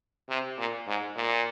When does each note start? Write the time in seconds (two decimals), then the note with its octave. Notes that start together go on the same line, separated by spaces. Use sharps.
0.29 C3
0.58 A#2
0.87 G#2
1.16 A#2